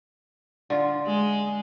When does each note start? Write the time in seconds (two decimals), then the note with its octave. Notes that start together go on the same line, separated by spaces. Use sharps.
0.70 D3 F4
1.06 G#3